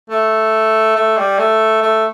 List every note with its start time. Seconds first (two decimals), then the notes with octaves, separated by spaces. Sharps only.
0.10 A3
0.96 A3
1.18 G3
1.39 A3
1.82 A3